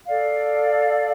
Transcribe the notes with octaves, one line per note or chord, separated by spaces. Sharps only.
A4 D5 F5